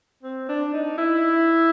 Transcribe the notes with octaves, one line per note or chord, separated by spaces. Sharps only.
C4
D4
D#4
E4